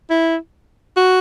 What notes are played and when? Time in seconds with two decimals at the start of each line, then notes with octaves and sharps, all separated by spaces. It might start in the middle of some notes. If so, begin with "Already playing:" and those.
0.10 E4
0.97 F#4